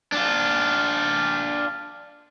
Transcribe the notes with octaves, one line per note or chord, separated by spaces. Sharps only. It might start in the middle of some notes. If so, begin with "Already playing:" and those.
D4 F4